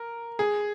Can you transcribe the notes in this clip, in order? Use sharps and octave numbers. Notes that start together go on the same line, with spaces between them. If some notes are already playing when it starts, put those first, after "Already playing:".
Already playing: A#4
G#4